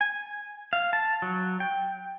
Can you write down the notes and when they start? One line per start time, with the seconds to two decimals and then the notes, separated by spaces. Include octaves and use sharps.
0.01 G#5
0.73 F5
0.93 A5
1.22 F#3
1.60 G5